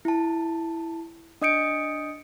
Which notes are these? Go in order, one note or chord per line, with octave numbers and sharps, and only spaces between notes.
E4 A5
D4 D#5 D#6 G6 C#7 D7